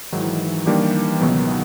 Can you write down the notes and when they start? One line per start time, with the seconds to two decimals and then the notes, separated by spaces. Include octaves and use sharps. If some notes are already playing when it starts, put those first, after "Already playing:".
0.12 G#2 D#3 E3 F#3
0.66 D#3 G3 A#3 D4 G4
1.20 C#2 B2 D#3 F#3 B3